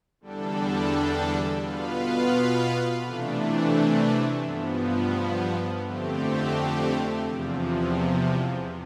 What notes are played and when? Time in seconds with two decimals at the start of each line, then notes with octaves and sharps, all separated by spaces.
0.21 E2 D3 G3 D4 A4
1.61 B2 B3 F4 B4 F5
3.01 C3 E3 A3 D4
4.41 G2 F3 B3
5.81 F2 D3 A3 C4 G4
7.21 E2 C3 F3